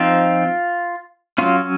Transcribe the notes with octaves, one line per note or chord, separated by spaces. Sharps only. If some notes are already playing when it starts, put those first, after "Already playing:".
Already playing: F3 C4 D#4 F4
F#3 C#4 F4